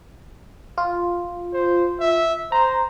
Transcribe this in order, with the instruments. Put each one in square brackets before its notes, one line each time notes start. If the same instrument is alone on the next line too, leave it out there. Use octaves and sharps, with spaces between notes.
[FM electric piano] F4
[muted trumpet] C5
E5
[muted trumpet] C5 [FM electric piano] A#5